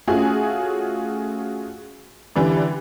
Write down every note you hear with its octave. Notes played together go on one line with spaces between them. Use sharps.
A3 C#4 F4 F#4 G#4
D3 E3 G3 D4